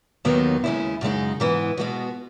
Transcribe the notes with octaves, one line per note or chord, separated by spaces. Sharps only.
D#2 D#3 F#3 B3 D#4
D#2 C#3 G#3 C#4 E4
F#2 C#3 G#3 D#4
G#2 E3 B3 E4
B2 G#3 B3 F#4